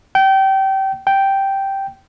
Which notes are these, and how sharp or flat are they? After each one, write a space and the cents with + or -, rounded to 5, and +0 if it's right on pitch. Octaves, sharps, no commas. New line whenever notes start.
G5 -25
G5 -5